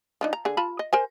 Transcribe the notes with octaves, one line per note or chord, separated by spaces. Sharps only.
F3 D4 D#4
A#5
D3 G#4
F4 A5 B5
D#5
A#4 C5 G#5